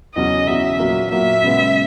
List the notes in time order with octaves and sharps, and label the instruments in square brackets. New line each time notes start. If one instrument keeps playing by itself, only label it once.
[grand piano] E2 C#3 F#3 C#4 [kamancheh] D#5
[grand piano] E2 C#3 F#3 C#4 [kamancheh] E5
[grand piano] A#2 F#3 A#3
[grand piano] A#2 F#3 A#3 [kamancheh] E5
[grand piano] C#3 G#3 B3